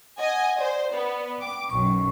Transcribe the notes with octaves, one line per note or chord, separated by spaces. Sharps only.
D#5 F#5 G#5
C5 D5
B3
G5 D6
B1 F#2 C#6